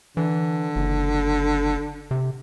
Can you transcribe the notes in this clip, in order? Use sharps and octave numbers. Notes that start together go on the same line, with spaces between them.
D3 E3
F#1
C3